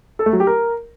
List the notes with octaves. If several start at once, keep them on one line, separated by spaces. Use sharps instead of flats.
A4
A3
F#3
G4
A#4